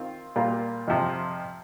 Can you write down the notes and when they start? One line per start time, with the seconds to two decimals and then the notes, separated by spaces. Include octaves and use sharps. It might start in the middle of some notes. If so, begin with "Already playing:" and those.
Already playing: D#3 C4 F4
0.36 A#2 G3 A#3 F4
0.88 F2 C3 F3 C4